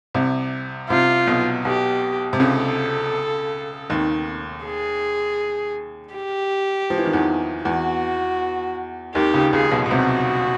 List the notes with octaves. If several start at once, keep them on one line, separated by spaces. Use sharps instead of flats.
C2 C3
C2 C3 F4
B1 B2
B1 B2 G4
C3
C#2 C#3 A4
D#2 D#3
G#4
G4
F3
E3
D#3
E2 E3
E2 E3 F#4
D#2 D#3 G4
C#2 C#3
C#2 C#3 G#4
B1 B2
B2
C2 C3 F#4